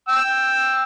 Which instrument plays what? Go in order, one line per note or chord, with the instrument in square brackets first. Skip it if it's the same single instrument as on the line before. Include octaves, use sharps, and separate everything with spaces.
[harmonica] G5 E6